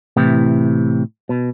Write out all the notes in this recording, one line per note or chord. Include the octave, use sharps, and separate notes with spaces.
A2 C3 E3
B2